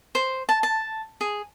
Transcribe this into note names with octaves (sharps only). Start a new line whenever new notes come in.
C5
A5
A5
G#4